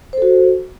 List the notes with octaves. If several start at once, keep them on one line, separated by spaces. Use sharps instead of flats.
F#4 A4 C5